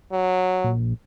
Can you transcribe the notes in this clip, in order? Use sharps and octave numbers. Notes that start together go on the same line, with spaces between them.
F#3
A#1